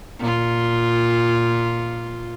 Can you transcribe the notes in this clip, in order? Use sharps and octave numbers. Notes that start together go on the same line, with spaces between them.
A#2 F4